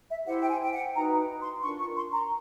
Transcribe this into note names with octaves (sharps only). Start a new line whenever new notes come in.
E5
E4 G4 C5 F#5
G5
G#5
G5
F#5
D#4 F#4 B4 A#5
C6
D4 F4 A#4 C#6
C#6
C6
A#5